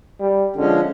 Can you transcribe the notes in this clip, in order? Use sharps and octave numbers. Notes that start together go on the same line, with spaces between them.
G3
D3 F3 G#3 C#4